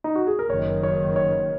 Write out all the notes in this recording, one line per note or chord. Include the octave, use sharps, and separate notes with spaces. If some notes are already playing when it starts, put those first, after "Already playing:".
D#4
F#4
G#4
A#4
F#1 F#2 D#3 C#5
C#5
C#5